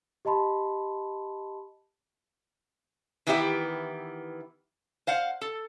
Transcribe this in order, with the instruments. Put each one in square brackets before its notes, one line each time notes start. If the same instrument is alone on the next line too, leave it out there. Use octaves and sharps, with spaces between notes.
[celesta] G4 D#5 A5 B5 C6
[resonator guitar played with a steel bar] D#3 E3 B3 E4 G4 E5
C5 F5 F#5
A4